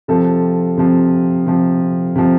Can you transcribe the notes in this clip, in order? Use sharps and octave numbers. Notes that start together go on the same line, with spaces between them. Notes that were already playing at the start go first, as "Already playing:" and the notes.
C3 F3 A4
C3 F3
C3 F3
C3 F3